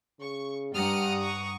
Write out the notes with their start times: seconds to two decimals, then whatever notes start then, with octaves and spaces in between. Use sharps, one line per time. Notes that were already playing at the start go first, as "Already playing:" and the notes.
0.20 C#3 C#6
0.75 G2 G3 F#5 A#5 D#6 F6
1.23 C#6